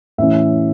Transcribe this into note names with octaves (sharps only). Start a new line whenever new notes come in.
A2 E3 C#4 E5